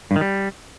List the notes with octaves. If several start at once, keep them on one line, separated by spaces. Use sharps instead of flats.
G2
D#3
G3